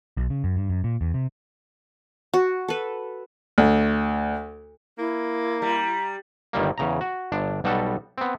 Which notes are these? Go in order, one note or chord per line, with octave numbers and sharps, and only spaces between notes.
B1
C#3
F#2
G2
F#2
A#2
E2
C3
F#4
A4 B4
D2
A#3 E4
G3 A#5
G1 D#3 G3 A#3
E2 C#3 A#5
F#4
G1 D4
B1 G3 B3 F#4 A4
B3 C4